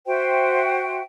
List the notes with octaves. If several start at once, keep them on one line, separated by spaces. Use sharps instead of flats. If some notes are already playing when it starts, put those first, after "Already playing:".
F#4 C5 E5 G5